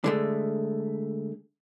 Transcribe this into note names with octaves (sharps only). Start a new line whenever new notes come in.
D3 G#3 A3